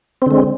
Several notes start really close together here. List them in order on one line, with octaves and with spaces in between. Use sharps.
C4 D3 G#3